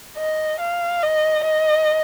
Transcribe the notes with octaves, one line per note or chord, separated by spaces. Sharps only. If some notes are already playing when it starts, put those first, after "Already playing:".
D#5
F5
D#5
D#5